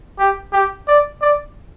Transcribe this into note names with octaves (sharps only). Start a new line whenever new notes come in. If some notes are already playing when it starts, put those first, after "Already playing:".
G4
G4
D5
D5